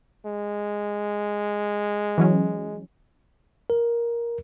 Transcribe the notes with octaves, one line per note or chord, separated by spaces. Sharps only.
G#3
E3 F#3 C#4
A#4